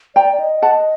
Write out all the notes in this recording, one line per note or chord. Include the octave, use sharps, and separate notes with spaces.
D5 G5 A#5
D5
D#5
F#5 A5